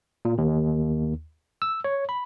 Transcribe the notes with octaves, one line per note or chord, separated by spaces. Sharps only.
A#2
D#2
E6
C#5
B5